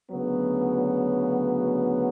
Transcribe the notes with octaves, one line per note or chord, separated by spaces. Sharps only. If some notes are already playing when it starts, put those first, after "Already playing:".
D2 C#3 F#3 B3